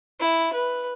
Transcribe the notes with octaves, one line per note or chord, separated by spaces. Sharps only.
E4
B4